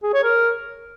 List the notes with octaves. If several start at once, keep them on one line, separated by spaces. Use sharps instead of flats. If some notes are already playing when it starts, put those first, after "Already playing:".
G#4
C#5
A#4